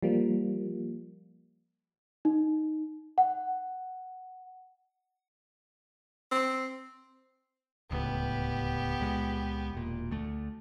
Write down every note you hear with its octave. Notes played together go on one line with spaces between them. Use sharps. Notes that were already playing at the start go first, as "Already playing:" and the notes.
F3 G3 A#3
D#4
F#5
C4
D1 C#2 A2 B3 G4
C#2 A#2 G#3
E1 A#2
D2 A3